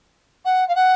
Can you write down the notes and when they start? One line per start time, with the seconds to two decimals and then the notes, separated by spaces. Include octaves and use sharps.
0.45 F#5
0.68 F5
0.75 F#5